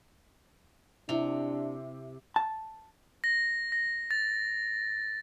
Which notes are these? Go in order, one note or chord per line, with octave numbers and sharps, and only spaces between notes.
C3 D4 E4 F7
A5
A#6
A#6
A6